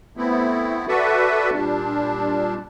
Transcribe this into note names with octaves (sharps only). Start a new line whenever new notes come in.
A3 B3 C4 E4
F#4 A4 B4 D5 E5 F#5
A#2 G3 D4